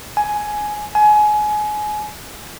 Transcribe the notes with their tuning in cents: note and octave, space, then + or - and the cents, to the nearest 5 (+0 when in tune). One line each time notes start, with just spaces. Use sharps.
G#5 +10
G#5 +25